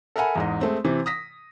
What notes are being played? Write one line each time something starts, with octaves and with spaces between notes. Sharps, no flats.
A4 A#4 E5 F#5 G#5 B5
E2 G#2 D#5
G#3 A3 C4
C3 E3 C4
D#6 A#6 B6